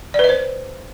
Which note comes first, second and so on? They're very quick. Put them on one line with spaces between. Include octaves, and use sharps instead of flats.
D5 B4 D#5 C5